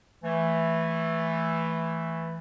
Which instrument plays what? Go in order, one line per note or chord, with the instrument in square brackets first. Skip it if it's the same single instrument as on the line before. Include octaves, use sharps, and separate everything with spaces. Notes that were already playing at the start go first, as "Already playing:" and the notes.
[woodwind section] E3 A3